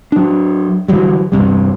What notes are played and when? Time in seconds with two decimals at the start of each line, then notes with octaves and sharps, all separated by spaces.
0.12 F#3 D4
0.88 D3 E3 F#3 G3
1.32 E2 G2 C3 G3